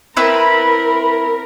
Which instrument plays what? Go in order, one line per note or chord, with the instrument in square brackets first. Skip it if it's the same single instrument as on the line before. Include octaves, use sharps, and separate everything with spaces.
[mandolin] C4 E4 B4 [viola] A#4 [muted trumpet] B5